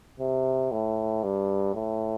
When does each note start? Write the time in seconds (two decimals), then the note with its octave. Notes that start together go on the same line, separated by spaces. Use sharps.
0.20 C3
0.72 A2
1.23 G2
1.74 A2